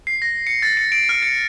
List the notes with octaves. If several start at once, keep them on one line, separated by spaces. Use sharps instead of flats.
C7
A#6
C#7
A6
C#7
D7
F6
C#7